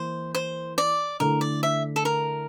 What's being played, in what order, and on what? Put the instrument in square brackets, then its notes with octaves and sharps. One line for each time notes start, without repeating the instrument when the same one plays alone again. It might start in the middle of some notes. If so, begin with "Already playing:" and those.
Already playing: [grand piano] E3 A#3 E4 [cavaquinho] C5
[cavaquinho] C5
D5
[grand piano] D3 A3 E4 [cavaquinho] A#4
[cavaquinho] D5
E5
A4
A#4